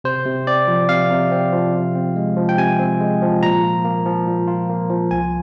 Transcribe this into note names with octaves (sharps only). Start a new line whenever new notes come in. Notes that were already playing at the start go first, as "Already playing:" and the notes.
C3 C5
C3
C4 D5
F3
C3 F5
C3
C4
F3
C3
C4
G#3
F3
G5
C3 G#5
C4
G#3
F3
A#2 A#5
F4
A#3
F3
A#2
F4
A#3
F3
C2 G#5